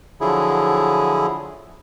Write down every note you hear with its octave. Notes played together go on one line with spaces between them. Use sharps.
D3 F3 F#3 E4 G#4